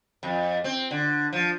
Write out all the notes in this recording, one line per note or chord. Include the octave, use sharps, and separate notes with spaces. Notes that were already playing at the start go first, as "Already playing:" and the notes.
F2
C4
D3
F3